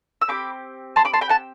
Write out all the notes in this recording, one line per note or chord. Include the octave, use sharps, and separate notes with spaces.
E6
C4 G4 B5 D6
A5 C6
B5 D6
A5 C6
G5 B5
F#5 A5